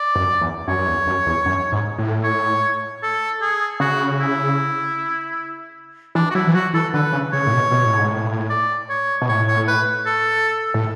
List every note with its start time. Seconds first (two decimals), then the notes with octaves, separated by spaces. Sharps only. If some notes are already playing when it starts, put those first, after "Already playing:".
Already playing: D5
0.15 F#2
0.41 E2
0.68 F#2 C#5
0.79 F#2
0.87 E2
1.07 F#2
1.26 E2
1.46 F#2
1.72 G#2
1.98 A2
2.24 C#5
3.03 A4
3.41 G#4
3.80 C#3 F#4
4.20 E4
6.15 E3 D4
6.30 F#4
6.35 F#3 E4
6.47 E3
6.54 F#3 F#4
6.74 E3 A4
6.94 D3 B4
7.13 C#3
7.32 C#3 C#5
7.47 A2
7.53 B2
7.71 B2
7.85 A2
7.98 G#2
8.11 A2
8.50 D5
8.89 C#5
9.22 B2
9.29 A2 C#5
9.48 C#5
9.67 B4
10.06 A4
10.74 A2